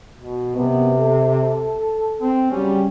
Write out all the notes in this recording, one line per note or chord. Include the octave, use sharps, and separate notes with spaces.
B2
F#2 C3 B3
A4
C4
C#3 F#3 G3 C#4